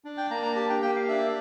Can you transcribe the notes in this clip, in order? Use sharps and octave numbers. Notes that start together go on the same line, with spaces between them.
D4
G5
A#3 A#5
A#5
G4 A5
G5
A#3 G5
F5
D4 E5